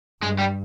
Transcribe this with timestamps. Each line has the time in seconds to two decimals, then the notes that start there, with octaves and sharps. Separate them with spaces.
0.22 G2 G#3
0.39 G3